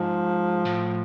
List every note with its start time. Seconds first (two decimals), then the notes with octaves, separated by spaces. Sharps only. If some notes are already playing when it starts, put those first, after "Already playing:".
Already playing: G#2 F3
0.65 A2